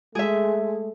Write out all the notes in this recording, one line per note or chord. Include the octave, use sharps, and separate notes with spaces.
G#3 A3 G#4 E5